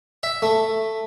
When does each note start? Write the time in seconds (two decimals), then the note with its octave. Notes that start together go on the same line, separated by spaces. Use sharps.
0.23 E5
0.42 A3